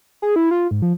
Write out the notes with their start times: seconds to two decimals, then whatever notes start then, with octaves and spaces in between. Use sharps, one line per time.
0.22 G#4
0.36 E4
0.51 F4
0.71 G#2
0.82 F3